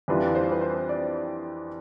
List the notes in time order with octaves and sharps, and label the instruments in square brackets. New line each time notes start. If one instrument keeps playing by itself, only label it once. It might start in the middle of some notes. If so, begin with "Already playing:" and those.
[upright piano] F2 E3 G3 D4 F4 [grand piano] B4
[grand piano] C5
B4
C5
D5